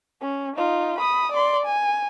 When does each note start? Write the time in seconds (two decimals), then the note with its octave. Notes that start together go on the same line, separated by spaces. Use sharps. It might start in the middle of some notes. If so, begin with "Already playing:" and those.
0.22 C#4
0.56 D#4 F4
0.98 B5 D#6
1.32 D5 C6
1.65 G#5